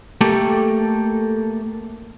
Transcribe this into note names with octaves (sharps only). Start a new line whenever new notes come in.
A3 A#3 G4 A4